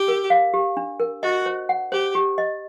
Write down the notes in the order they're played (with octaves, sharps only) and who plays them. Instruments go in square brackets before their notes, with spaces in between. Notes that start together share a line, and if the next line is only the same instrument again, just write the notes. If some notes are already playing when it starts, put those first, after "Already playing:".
Already playing: [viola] G4
[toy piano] A#4
F5
G4
D4
A#4
[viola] F#4 [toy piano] D#5
[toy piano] C5
F#5
[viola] G4 [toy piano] C5
[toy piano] G4
D#5